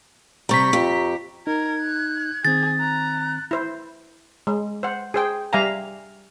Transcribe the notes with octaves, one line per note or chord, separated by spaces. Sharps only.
C3 G3 A#5 C#6 B6
F2 G4
D#4 A#4 G#6
F#6
D#3 C4 G#4 A6
A#5 F#6
E4 C5
G#3
C5 F#5
G#4 C5 G5
G3 E5 F5 G#5 A#5